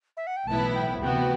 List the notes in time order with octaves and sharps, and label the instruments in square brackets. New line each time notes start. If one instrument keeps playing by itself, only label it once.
[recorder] E5
F#5
G5
[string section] B1 A2 E3 B3 E4 [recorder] A5
[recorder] G5
[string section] D2 C3 E3 B3 F#4 [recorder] G5